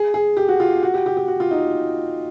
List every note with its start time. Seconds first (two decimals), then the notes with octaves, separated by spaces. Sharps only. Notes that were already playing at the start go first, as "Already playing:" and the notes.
Already playing: G#4
0.14 G#4
0.37 G4
0.48 F#4
0.60 F4
0.83 F#4
0.94 G4
1.06 G4
1.17 G4
1.28 F#4
1.40 F4
1.51 D#4